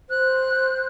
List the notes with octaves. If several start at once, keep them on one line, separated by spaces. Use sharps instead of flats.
C5 F#6